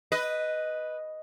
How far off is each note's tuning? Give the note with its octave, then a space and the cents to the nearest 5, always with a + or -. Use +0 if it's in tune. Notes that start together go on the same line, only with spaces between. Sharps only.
B4 +0 D#5 +0